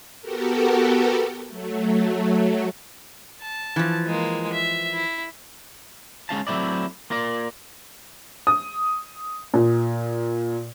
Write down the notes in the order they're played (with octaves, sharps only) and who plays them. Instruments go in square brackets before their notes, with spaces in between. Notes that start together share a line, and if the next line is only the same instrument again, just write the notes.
[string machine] B3 F#4 G4 A4 A#4
F#3 A3
[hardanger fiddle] A5
[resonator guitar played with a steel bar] E3 F3
[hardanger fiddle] G#3 A#3
E5
E4
[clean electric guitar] G#3 C#4 F5 A5
F#3 A3 C4 E4 D5
A#3 F4 A#4 D5
[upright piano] D#6
A#2